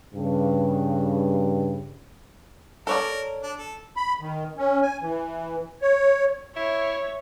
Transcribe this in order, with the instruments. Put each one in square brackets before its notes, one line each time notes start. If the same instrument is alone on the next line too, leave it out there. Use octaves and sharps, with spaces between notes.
[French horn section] G2 C#3
[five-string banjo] A4 C#5 D5 [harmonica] A#4
[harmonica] D4
A4
[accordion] B5
D#3
C#4
G#5
E3
C#5
[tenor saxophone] E4 [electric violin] C#5 E5